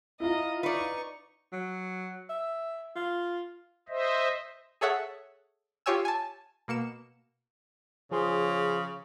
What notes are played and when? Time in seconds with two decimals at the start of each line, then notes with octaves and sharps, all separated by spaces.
0.20 E4 F4 D#5 A#5
0.63 D#4 B4 D5 C#6
1.52 F#3
2.29 E5
2.96 F4
3.89 C5 D#5 E5
4.81 G#4 A4 C#5 E5 F#5
5.86 F4 G4 C#5 G#5 E6
6.05 G#5 A5
6.68 B2 A#3 C#7 E7
8.11 C#3 F3 G#4 C6